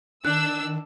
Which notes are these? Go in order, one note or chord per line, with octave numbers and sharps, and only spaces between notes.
D#3 D4 E6 F#6